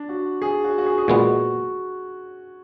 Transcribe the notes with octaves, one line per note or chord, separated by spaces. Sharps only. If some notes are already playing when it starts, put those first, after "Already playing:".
Already playing: D4
F#4
G#4
F#4
F#4
G#4
G#4
A#2 G#3 B3 F#4